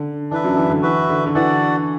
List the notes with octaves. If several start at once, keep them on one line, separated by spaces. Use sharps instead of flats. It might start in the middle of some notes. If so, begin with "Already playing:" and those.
Already playing: D3
E3 D4 B4 E5
F#2 F#3
E3
D3
E3 F#4 B4 E5
D3
D3
E3 F#4 A4 D5 F#5